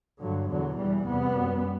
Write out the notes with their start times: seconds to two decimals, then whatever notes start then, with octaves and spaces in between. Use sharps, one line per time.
0.22 G2 D3 F#3
0.50 E2 B2 D3 F#3
0.78 E2 B2 E3 G3
1.06 E2 C3 G3 B3
1.35 F#2